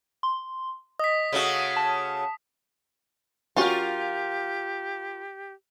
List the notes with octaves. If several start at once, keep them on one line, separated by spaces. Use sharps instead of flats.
C6
D#5 D#6 B6
C#3 A3 F#4
A5
F#3 C#4 F4 G4 A#4